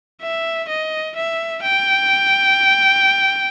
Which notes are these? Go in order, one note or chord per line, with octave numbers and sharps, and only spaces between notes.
E5
D#5
E5
G5